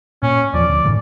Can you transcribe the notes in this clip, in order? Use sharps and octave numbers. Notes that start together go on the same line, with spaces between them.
A#2 C#4
E2 F3 D5
D2
F#1 A2 D#3